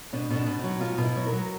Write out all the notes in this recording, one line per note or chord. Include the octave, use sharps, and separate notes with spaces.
B2 D4
B2
D4
B2
F#3 D#4
B2 F4
B2
E4
F#3
A#4
F#3